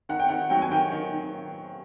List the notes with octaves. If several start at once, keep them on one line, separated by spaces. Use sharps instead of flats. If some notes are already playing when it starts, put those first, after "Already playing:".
D#3 F#5
G5
D#3 F#5
F#3 G5
G#5
D#3 G5
D#3
D#3